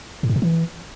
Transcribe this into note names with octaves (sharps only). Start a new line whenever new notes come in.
A2
G#2
A#2
E3